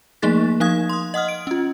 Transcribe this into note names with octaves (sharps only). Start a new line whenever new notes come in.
F3 A3 A#3 D#4 G#4 A6
F3 D#4 F5 D#6 G#6
C6 D#6
D#5 F#5 D#6 F6
D7
C#4 F4